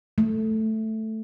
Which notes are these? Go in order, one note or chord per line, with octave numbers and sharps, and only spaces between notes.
A3